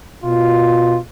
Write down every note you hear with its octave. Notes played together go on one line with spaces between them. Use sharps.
B2 F4